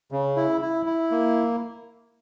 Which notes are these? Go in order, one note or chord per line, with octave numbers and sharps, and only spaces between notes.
C#3
E4
E4
E4
A#3